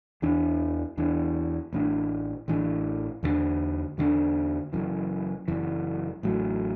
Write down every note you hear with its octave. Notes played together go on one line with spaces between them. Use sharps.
E2 E3 D4
E2 E3 D4
A1 A2 E3 D4
A1 A2 E3 D4
E2 D3 A3 D4
E2 D3 A3 D4
F#1 F#2 E3
F#1 F#2 E3
A1 A2 F#3